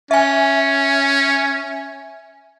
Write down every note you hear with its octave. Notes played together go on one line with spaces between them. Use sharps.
C#4 E5 G#5